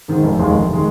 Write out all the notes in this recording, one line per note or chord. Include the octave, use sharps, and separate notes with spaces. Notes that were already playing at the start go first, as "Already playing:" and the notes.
G#2 D#3
F1
D#2 D#3 G#3
F1
D#3 G#3